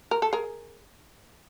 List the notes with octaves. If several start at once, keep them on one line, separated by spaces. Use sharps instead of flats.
A#4
A4
G#4 A#4